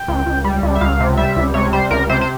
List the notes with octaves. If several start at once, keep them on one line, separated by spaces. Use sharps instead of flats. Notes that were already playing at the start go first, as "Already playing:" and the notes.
Already playing: G5
C#2
C#2
G3
C#2
E5
C#2 F5
C3
G3 E5
C#2
C3 C#5
G3 C5
C#2 A#4
C3 C5
C5